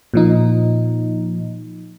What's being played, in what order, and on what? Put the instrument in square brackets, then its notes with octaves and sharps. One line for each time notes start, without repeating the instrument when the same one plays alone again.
[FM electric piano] A#2 F3 D#4